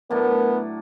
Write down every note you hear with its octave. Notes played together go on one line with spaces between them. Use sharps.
A2 F#3 B3 D4 A#4